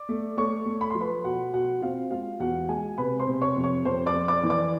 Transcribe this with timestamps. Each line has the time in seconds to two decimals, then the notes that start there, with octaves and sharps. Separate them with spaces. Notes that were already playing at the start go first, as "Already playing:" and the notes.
Already playing: D5 D6
0.09 A3
0.37 A3 C#5 C#6
0.66 A3
0.81 B5
0.90 F3 C6
1.00 B4 B5
1.24 B2 F#4 F#5
1.53 B2 F#4 F#5
1.82 C4 F4 F5
2.11 G#3 F4 F5
2.40 E2 F#4 F#5
2.69 G#3 G#4 G#5
2.98 C3 B4 B5
3.20 C5 C6
3.27 C3
3.42 C#5 C#6
3.57 F2
3.64 C#5 C#6
3.85 F2 C5 C6
4.06 D5 D6
4.14 F2
4.28 D5 D6
4.43 E3
4.50 D5 D6